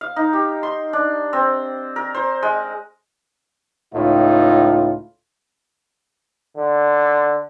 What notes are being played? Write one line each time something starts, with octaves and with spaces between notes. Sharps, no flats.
F5
D#4
G4
C6
D4
C4
A#4
C5
G#3
C#2 A2 D#4 F4
D3